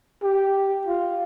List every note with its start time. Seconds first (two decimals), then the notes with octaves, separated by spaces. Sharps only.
0.23 G4
0.87 F4